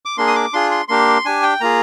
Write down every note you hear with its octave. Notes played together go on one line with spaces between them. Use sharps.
D6
A#3 D4 G#4 C6
D#6
D6
D4 F4 G#4 C6
C6
A#3 D4 G4 C6
D4 G4 G#5
G5
A#3 F4 G#4 A#5